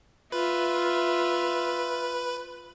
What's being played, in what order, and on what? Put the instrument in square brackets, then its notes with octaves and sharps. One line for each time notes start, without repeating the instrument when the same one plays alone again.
[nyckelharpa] F4 E5 [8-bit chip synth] B4